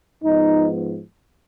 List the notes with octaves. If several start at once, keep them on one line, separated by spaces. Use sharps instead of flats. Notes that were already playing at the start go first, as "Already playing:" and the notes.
G#2 F3 B3 D#4